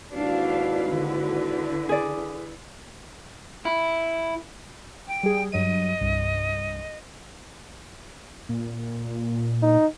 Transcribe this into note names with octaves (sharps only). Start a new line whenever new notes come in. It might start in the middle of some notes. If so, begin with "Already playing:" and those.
D#2 G#2 D4 E4 F#4 B4 F5
D3
G#4 D5
E4
G5
G3 G#4
G2 F#3 D#5 D#7
C2 G2
A#2
D#4